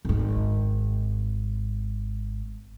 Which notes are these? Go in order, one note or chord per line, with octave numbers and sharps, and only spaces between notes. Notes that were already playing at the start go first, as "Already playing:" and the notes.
G#1 G#2